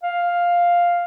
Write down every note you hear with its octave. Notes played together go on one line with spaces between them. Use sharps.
F5